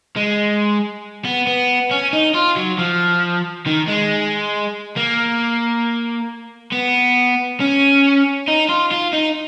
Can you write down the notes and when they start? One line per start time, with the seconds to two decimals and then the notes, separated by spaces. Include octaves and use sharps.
0.16 G#3
1.25 B3
1.47 B3
1.91 C#4
2.13 D#4
2.35 F4
2.56 F#3
2.78 F3
3.66 D#3
3.88 G#3
4.97 A#3
6.72 B3
7.60 C#4
8.48 D#4
8.69 F4
8.92 F4
9.13 D#4